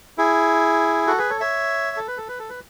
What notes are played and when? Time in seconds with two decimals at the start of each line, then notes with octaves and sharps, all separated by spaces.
0.18 E4 G#4
1.07 F#4 A4
1.18 G#4 B4
1.30 A4 C#5
1.40 C#5 E5
1.97 A4
2.08 B4
2.17 A4
2.28 B4
2.39 A4
2.49 B4